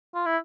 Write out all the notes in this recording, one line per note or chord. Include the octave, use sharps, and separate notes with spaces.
F4
E4